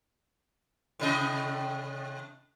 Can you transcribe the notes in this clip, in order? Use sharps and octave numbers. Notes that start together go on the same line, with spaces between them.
A2 C3 D#5